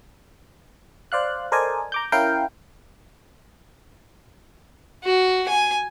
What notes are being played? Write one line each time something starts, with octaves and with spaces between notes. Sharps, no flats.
C5 D5 F5 F#6
A4 A#4 C5 D5 D#5 G#5
A#5 D6 G6
C#4 E4 A#4 F5 G5
F#4
G#5